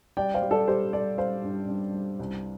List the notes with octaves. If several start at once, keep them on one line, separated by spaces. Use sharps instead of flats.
G3 D5 G5
C5 F5
G3
A4 D5
G3 G4 C5
G3 A4 D5
G3 C5 F5
G2
G2
G3
C2